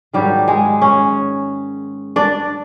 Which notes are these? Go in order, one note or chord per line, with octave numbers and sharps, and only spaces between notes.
G#2 D#3 F#3 G3 G4
G#3 G#4
C#4 C#5
D4 D5